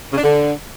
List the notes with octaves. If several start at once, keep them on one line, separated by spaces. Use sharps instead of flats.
C#3
D4
D3